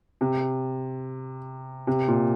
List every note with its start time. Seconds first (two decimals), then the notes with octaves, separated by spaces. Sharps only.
0.21 C3
1.87 C3
2.08 A#2